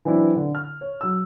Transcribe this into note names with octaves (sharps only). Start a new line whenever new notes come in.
E3 F#3 C4 D4 E4
D3
F6
C#5
F#3 E6